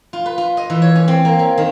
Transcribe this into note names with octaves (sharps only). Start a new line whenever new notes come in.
F4
B4
F4
D#5
E3
C#5
C#4
C4
A#3
C#4
D#3